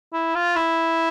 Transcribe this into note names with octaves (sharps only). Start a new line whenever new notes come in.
E4
F4
E4